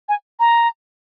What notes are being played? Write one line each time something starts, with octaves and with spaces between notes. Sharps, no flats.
G#5
A#5